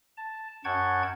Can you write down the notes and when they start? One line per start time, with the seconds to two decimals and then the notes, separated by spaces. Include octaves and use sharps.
0.17 A5
0.65 F#2 F#5 G5 A5 C#6 G#6